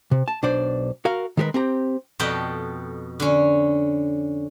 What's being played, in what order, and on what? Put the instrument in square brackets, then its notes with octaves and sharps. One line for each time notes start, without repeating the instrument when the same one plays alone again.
[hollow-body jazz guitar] C3
A5
B1 D4 C5 D5
F#4 A#4 F5
D#3 G#3 G4 A#4 B4
C4 G4 A#5
[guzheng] F2 B2 A4 G5 B5
D3 C#4